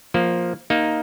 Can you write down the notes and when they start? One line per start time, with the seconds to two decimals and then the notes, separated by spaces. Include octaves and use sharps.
0.14 F3 A#3
0.70 A#3 D#4